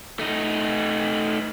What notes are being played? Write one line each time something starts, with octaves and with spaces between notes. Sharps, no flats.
A3 D#4